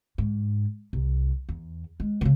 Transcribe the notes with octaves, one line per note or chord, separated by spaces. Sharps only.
G#2
C2
E2
G#3
C#3 E3